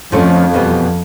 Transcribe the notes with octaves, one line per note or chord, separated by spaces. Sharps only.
F2 D3 F3 A3 C#4
E2 B2 G3 B3